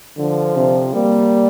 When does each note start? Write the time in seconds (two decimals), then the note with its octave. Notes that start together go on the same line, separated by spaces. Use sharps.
0.18 D3 F3
0.56 C3
0.94 G3 A#3